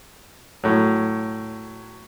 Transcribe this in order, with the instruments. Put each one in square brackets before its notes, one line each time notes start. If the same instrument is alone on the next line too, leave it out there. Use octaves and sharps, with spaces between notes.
[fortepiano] A2 F#3